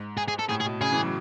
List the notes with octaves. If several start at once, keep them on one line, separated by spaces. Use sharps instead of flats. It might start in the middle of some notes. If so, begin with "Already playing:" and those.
Already playing: G#2
G#4
G#4
A4
A2 G#4
G#4
B2
C#3 G#4
E3
F#3